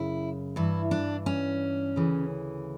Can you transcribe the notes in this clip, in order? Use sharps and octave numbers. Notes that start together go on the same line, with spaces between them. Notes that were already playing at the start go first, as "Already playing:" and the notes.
Already playing: F#2 C#3 E4
G2 E3 E4
D4
C#4
D2 C#3 E3